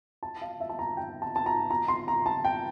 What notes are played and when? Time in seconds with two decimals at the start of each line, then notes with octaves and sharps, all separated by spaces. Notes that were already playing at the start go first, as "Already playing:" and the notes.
0.23 A5
0.42 F5
0.60 E5
0.69 A5
0.79 A#5
0.97 G5
1.22 A5
1.36 A5
1.46 A#5
1.71 A#5
1.88 C6
2.08 A#5
2.26 A5
2.44 G5